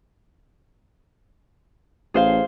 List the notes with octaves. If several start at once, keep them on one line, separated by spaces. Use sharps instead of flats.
A1 G#4 C5 F5